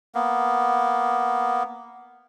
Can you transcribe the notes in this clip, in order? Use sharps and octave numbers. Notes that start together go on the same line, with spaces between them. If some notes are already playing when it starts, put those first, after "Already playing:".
A#3 B3